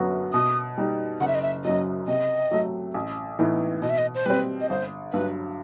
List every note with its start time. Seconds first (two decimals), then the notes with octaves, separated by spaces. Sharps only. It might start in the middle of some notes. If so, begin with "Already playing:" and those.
Already playing: G1 F#2 F#3 B3 F#4
0.33 B2 D#6
0.78 G3 D#4
1.21 F#1 F#5
1.28 E5
1.35 D#5
1.42 E5
1.64 F#2 F#3 D#5
2.08 C3 D#5
2.51 F#3 A3
2.94 A1
3.39 A2 E3 B3 D#4
3.82 B2 D#5
3.90 E5
3.98 D#5
4.15 C5
4.26 G3 C4 B4
4.61 D#5
4.69 G1 C5
5.13 G2 F#3 B4